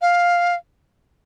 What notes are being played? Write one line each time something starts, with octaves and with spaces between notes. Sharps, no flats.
F5